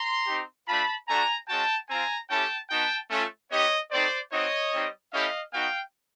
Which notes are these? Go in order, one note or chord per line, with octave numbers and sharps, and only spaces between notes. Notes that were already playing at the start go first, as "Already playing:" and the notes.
Already playing: A#5 C6
C4 D#4 G4
A3 D4 F4 A5 B5
A3 D4 F#4 G#5 A#5
G#3 C#4 F#4 G5 A5
C4 F4 G#5 A#5
A3 C#4 E4 G4 G5 A5
B3 D#4 F#4 G5 A5
A3 C#4 F4
B3 D#4 G4 C#5 D#5
A3 C4 D#4 C5 D5
C4 D#4 F#4 C#5 D#5
G3 C4 D#4
A3 C#4 E4 G4 D#5 F5
B3 D#4 F#4 F5 G5